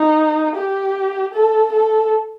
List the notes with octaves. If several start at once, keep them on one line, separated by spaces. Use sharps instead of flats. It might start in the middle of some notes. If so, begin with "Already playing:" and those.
Already playing: D#4
G4
A4
A4